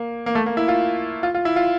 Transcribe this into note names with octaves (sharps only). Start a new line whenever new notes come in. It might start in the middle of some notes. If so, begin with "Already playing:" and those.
Already playing: A#3
A#3
A3
A#3
E4
F4
F4
F4
E4
F4